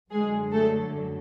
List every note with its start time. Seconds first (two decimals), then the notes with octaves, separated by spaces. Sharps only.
0.12 F#2 D3 F#3 G#3 G#4
0.53 A3 A4